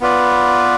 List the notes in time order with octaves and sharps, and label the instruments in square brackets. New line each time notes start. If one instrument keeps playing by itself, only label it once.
[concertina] B3 F4 B4 D5